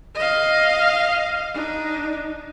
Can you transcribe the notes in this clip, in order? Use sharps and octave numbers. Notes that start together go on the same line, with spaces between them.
D#5 F5
D4 D#4